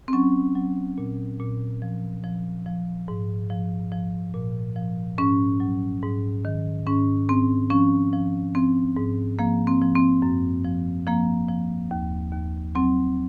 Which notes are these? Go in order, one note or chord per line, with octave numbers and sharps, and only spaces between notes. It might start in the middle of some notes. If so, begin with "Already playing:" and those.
C4
F#3 C#4
F#3
A#2
A#2
F3
F3
F3
G#2
F3
F3
A#2
F3
G#2 C#4
F#3
G#2
D#3
G#2 C#4
G#2 C4
F3 C#4
F3
F3 C4
G#2
F3 A#3
C4
F3
C4
F#2
F3
F3 A#3
F3
D#2
D#2
F#3 C4